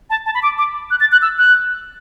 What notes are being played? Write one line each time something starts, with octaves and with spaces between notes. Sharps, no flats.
A5
A5
B5
D6
D6
F#6
A6
F#6
E6
F#6